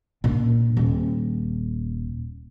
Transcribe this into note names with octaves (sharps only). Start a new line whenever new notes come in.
A#2 D4
D#1